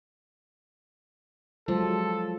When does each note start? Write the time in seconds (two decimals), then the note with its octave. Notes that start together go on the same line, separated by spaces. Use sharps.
1.68 F3 F#3 G#3 A4